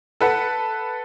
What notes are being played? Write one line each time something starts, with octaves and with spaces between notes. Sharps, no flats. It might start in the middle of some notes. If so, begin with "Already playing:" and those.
A4 B4 F#5 A5